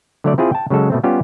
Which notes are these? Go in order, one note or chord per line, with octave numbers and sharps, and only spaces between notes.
D3 F#3 A3 C#5 D5
C4 E4 F4 G#4
G5 A5
C#3 F#3 G#3 A4
B2 A3 C4
G3 B3 C#4 F4 G4